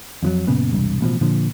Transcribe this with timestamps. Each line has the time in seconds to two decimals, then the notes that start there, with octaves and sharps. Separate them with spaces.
0.23 F2 F3 F#3
0.47 F#1 A#2 C#3 B3
0.72 E1 C2 G2
1.01 A1 B2 D#3 F3
1.21 A#2 D3 F3